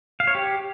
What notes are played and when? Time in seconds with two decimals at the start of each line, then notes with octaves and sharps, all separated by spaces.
0.20 F5
0.27 C#5
0.35 G4